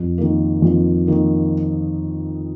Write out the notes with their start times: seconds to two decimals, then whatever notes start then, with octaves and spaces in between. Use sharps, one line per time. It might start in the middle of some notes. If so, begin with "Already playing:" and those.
Already playing: F2
0.18 D#3 A#3
0.62 F2
1.07 D#3 A#3